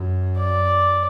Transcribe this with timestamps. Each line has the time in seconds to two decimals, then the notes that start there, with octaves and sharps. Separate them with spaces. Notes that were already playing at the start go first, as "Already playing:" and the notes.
Already playing: F#2
0.39 D5